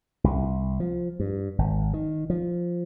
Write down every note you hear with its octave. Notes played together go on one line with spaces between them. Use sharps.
C2
F3
G2
G#1
D#3
F3